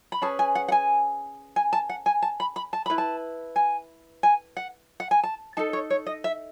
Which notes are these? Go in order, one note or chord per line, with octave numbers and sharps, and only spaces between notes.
B5
C#4 G#4 B4 A5
G#5
F#5
F#5
G#5
G#5
A5
F#5
G#5
A5
B5
B5
A5
E4 B4 B5
A5
G#5
G#5
F#5
F#5
G#5
A5
D#4 A4 A5
C#5
C#5
D#5
E5